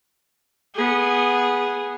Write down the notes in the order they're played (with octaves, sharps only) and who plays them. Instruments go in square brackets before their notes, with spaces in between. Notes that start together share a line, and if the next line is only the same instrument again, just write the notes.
[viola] B3 G#4